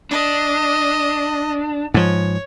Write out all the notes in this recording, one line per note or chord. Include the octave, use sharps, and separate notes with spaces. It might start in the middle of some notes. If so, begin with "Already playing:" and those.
D4 D#5
G#2 F3 C#5